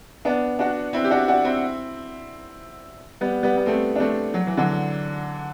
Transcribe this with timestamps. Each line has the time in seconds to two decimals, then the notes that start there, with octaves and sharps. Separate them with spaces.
0.25 B3 D4
0.59 D4 F#4
0.93 C4 E4
1.04 G4
1.10 D4 F#4
1.28 D4 F#4
1.45 C4 E4
3.21 G3 B3
3.43 G3 B3
3.57 B3
3.66 A3 C4
3.96 D4
4.00 A3 C4
4.34 F#3
4.47 E3
4.57 D3 F#3